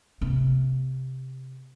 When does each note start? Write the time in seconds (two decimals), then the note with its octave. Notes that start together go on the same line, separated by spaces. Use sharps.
0.21 C3 B3